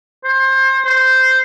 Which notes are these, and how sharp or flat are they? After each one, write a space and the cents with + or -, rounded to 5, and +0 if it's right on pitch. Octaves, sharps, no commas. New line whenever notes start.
C5 +25
C5 -10